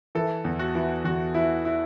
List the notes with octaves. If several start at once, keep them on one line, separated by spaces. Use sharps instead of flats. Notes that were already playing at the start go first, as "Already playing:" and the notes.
E3 A4
E2
F#4
E3
E2 F#4
E3 E4
E4